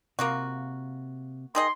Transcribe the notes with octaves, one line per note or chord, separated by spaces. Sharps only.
C3 A#3 F4 F#4
D#3 G#4 D#5 C6